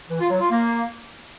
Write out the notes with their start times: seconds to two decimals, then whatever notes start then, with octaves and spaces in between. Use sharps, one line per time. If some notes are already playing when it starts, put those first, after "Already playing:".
0.09 E3
0.20 F4
0.30 F#3
0.40 F4
0.51 A#3